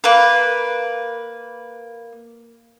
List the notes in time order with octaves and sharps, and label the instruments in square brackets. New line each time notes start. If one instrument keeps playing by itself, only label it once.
[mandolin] A#3 B4